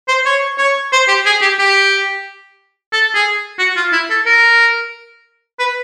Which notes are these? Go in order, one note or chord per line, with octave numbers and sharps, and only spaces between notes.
C5
C#5
C#5
C5
G4
G#4
G4
G4
A4
G#4
F#4
F4
E4
A4
A#4
B4